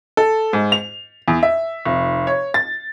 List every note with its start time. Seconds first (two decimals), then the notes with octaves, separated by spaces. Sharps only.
0.17 A4
0.53 G#2
0.72 F7
1.28 E2
1.43 E5
1.85 F1
2.27 C#5
2.54 A6